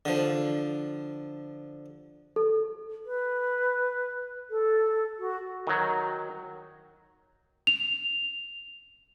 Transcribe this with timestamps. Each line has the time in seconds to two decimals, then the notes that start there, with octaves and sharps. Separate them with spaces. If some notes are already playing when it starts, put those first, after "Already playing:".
0.05 D3 F3
2.36 A4
3.05 B4
4.50 A4
5.19 F#4
5.67 D#3 F#3
7.67 F7